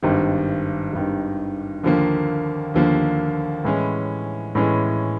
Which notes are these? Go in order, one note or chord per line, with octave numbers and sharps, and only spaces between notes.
G#1 G2 D#3
G#1 G2 D#3
D#2 D3 F3 A#3
D#2 D3 F3 A#3
A2 E3 G#3 C#4
A2 E3 G#3 C#4